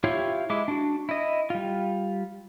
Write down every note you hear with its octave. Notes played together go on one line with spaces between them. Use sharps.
E4 F4 G4 C#5 F5
G#3 E4 D6
D4 F#4
E4 D#5
G3 F4